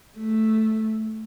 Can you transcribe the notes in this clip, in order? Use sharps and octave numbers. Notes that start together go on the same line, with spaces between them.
A3